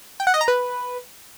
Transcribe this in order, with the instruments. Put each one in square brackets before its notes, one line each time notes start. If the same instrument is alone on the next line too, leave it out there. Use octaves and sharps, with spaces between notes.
[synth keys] G5
F#5
D#5
A#5
B4